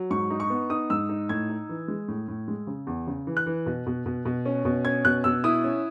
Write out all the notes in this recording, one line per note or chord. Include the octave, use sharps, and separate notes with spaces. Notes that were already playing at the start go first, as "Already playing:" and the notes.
Already playing: F#3
G#2 C#6
D#4
C#6
B3
D#4 D#6
G#2 E6
D#4
A2 G#6
D#4
E3
G#3
A2
A2
G#3
C#3
E2
C#3
E3
F#6
E3
B2
B2
B2
B2
C#4
B2
C#4 G#6
B2 F#6
B2 E6
E4 D#6
C#4